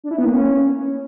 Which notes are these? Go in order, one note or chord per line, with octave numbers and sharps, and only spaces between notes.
D4
E4
B3
A#3
C#4